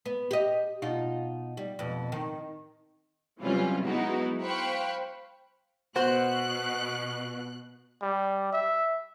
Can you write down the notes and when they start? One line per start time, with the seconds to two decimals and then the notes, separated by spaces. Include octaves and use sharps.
0.06 B3
0.31 G4 D#5
0.82 B2 D#4 F4
1.57 G3
1.79 F2 B2
2.12 D#3
3.39 C3 E3 F#3 G3 C#4 F4
3.85 F#3 G#3 B3 D#4 E4 F#4
4.42 C5 F5 G5 B5 C#6 F#6
5.96 B2 F#4 C5 F#6
8.02 G3
8.53 E5